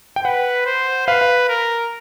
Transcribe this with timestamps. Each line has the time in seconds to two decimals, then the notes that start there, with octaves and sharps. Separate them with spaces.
0.16 G5
0.25 B4 F#5
0.66 C5
1.07 B4 F5
1.21 F5
1.49 A#4